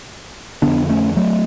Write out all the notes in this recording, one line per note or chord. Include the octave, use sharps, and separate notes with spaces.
F2 D3 B3 D4
A3 C#4
F#3 A3